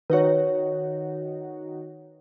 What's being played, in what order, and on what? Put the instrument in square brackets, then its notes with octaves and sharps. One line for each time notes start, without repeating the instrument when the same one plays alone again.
[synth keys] D#3 D#4 F#4 [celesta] B4 C#5